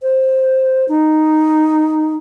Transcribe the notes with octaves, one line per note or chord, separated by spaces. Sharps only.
C5
D#4